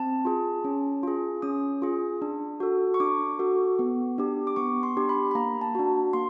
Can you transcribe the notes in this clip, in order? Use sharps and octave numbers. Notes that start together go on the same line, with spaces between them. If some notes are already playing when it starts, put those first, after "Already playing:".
Already playing: C4 A5
F4 G#4
C#4
F4 G#4
C#4 D#6
F4 G#4
D4
F#4 A4
C#6
D4 D6
F#4 A4
B3
D4 G4
D6
B3 C#6
C6
D4 G4
B5
B5
A#3 A#5
A5
D4 F#4
A#3 C6